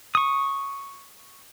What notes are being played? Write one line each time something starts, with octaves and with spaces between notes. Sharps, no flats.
C#6 D#6